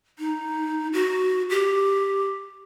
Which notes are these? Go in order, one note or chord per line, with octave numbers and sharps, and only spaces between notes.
D#4
F#4
G4